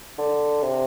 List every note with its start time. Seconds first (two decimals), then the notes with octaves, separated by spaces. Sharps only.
0.18 D3
0.62 C3